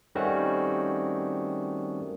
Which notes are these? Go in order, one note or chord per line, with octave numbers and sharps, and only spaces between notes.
D#3 G3 A3 C4 C#4 F#4